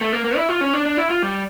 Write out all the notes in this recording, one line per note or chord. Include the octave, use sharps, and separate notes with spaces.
A3
A#3
A#3
E4
F4
C#4
D4
D4
E4
F4
G3